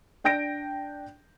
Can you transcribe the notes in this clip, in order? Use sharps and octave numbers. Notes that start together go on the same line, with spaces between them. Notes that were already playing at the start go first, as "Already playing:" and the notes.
D4 G5 G6 A#6 D7